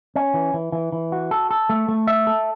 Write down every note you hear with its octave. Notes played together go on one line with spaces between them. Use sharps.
C#4
E3
E3
E3
E3
F#4
A4
A4
A3
A3
E5
A4